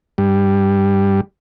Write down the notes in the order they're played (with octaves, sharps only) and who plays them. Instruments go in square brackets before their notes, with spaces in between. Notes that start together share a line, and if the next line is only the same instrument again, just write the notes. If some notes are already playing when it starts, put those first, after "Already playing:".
[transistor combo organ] G2 G3